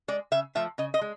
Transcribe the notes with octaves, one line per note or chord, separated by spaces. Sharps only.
G#3 D5
C#3 E5
F3 A3 E5
C#3 D#5
D#5
G#3